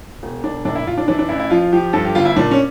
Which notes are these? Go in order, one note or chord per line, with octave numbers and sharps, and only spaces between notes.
E1
E1 D4
A#1 D4
E4
A#1 F4
D4
E3 D4
D4
A1 E4
E4
F3 F4
F3 G4
G2 A4
G4
G1 F4
E4
A#2 D4
C#4